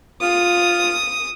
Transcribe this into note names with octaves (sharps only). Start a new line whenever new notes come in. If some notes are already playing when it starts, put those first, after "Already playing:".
F4 D#6